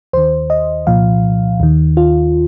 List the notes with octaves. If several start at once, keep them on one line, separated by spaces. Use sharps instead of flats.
D#2 D#3 C5
D#5
C2 A#2 F3 F5
D#2 D#3
F4